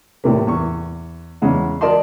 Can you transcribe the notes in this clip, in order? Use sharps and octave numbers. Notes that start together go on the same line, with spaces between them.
A2 C3 A#3
E2 C#6
E2 C#3 G#3 F#5
F#4 A#4 D5 D#5 A5 C6